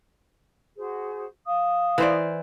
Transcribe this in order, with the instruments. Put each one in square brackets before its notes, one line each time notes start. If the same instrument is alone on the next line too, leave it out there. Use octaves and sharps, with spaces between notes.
[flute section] F#4 G#4 C5
F5 D#6
[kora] E3 C5 D5